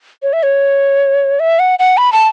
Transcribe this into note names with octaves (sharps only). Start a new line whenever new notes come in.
C#5
E5
C#5
E5
F#5
F#5
B5
A5